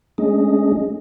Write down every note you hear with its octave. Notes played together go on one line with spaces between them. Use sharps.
G#3 A3 C#4 D4 G#4 D#5